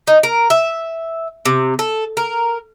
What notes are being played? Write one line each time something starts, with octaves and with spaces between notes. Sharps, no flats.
D#4
A#4
E5
C3
A4
A#4